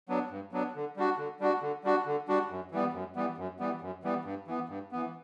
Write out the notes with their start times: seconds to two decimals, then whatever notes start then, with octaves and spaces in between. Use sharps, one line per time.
0.09 F#3 B3 D4
0.30 G2
0.52 F#3 B3 D4
0.75 D3
0.97 G3 D4 F#4
1.18 D3
1.40 G3 D4 F#4
1.62 D3
1.84 G3 D4 F#4
2.06 D3
2.28 G3 D4 F#4
2.50 F#2
2.71 E3 G3 B3
2.94 F#2
3.15 E3 G3 B3
3.38 F#2
3.59 E3 G3 B3
3.81 F#2
4.03 E3 G3 B3
4.25 G2
4.47 E3 B3
4.69 G2
4.91 E3 B3